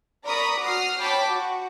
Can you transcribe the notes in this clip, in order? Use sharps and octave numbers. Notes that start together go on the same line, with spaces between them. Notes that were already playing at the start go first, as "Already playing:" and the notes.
A#4 D5 A#5 B5 C#6 D#6
F#4 D#6 F6 C7
C#5 G5 A5 B5 D6
F#4